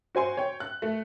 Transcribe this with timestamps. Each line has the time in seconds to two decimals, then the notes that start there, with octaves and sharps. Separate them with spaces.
0.15 F#4 C5 G#5 C6
0.37 C#5 G5
0.60 F#6
0.82 A3